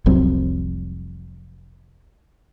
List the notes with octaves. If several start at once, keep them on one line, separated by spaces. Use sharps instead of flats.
F1 C2 F#3 C4